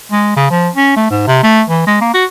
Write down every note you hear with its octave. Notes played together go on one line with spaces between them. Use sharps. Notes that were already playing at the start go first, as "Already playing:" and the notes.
G#3
C#3
F3
C#4
A3
G#2
C3
A3
E3
G#3
A#3
F#4